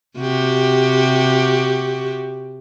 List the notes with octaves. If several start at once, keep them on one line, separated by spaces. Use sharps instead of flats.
C3 F#4 G4